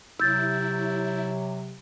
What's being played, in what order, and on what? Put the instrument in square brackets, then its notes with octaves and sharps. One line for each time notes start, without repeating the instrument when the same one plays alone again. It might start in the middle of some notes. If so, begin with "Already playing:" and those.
[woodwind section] C3 F#3 [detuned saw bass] E4 [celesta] E6 G6 A6